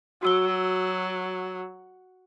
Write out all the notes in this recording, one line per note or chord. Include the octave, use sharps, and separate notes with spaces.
F#3 F#4 E6 G7